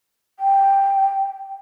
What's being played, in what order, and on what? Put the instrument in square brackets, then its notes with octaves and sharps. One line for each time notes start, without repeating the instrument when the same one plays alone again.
[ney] G5